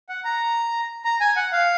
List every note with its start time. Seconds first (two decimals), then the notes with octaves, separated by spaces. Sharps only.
0.09 F#5
0.25 A#5
1.05 A#5
1.21 G#5
1.36 F#5
1.53 F5